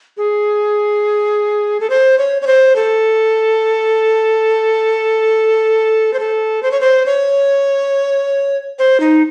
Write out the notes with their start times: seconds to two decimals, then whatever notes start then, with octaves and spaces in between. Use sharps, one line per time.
0.17 G#4
1.80 A4
1.90 C5
2.18 C#5
2.42 C#5
2.47 C5
2.76 A4
6.13 C5
6.19 A4
6.63 C5
6.71 C#5
6.81 C5
7.06 C#5
8.79 C5
9.00 D#4